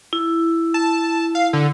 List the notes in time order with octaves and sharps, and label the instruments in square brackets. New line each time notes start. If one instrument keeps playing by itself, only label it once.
[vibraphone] E4
[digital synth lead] A5
F5
D3